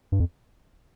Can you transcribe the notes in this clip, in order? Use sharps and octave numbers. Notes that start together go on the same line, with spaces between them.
G2
F2